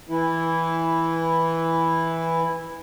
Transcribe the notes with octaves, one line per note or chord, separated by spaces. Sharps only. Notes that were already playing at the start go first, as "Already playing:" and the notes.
E3 E4